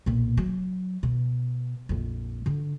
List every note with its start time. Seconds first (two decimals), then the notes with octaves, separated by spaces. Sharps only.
0.06 B1 A#2
0.37 F#3
1.03 B2
1.89 A#1 F2
2.46 D3 D4